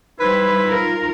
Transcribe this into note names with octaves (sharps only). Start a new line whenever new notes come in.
G3 D#4 E4 B4 C5
F4 A#4